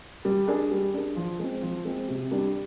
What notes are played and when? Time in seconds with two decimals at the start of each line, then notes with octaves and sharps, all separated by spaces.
0.25 G3
0.48 D4 G#4
0.71 G3
0.94 D4 G#4
1.16 F3
1.39 G#3 C4
1.62 F3
1.85 G#3 C4
2.08 C3
2.31 G3 D4